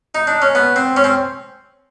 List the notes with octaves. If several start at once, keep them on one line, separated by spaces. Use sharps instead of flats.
D#4
D4
C#4
B3
C4
C#4
C4